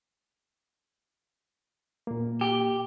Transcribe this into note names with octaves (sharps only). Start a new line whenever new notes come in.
A#2 A#3
G4